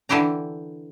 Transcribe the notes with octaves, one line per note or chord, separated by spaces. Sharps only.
D3 E3 E4 G4 A#5